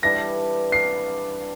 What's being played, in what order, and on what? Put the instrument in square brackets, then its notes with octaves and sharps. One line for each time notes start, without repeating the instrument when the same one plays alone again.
[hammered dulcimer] E3 G3 D4 A4 [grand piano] A#6
[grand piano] C7